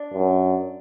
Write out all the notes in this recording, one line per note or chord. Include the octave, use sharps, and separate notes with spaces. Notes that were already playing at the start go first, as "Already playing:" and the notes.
Already playing: D4
F#2